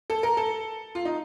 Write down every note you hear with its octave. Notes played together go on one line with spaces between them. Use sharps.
A4
A#4
A4
F4
D#4